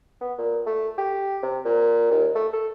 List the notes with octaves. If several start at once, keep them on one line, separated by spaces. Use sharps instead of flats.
B3
A#2
A3
G4
C3
A#2
D#2
A3
A4